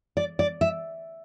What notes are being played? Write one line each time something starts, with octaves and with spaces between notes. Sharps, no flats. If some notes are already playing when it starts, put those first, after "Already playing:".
D5
D5
E5